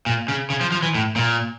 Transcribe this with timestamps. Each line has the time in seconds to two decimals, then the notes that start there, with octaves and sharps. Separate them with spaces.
0.06 A#2
0.28 C#3
0.50 C#3
0.61 F3
0.72 F3
0.83 E3
0.95 A2
1.16 A#2